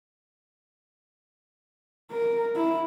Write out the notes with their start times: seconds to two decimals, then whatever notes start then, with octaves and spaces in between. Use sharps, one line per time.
2.11 A#4
2.56 E4